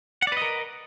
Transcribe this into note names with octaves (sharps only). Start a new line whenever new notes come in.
A#4 B4 D5 D#5 F#5